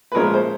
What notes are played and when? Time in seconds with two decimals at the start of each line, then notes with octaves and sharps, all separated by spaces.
0.12 B4
0.15 A#2 F3 G#3 C#4 A#4
0.34 C5